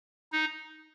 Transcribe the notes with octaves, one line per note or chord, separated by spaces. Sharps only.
D#4